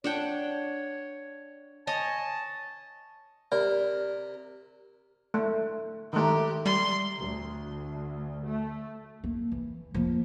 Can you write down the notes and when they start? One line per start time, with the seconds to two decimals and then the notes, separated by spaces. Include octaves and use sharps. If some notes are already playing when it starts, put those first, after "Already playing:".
0.04 D4 C#5 F#5 G5
1.87 C#5 D#5 G#5 A5
3.52 C3 A#4 D5
5.34 A3
6.13 D#3 A3 G4 G5 A#5 D#6
6.66 G3 C6
7.19 D2
8.46 A3
9.24 A#3
9.52 E3
9.94 F3 A#3